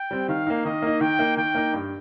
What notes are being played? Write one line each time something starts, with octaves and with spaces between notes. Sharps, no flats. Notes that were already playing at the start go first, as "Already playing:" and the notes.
Already playing: G5
G3 C4
D#3 F5
A#3 D#4
D#3 D#5
A#3 D#4
D#3 G5
A#3 D#4
D#3 G5
A#3 D#4
G2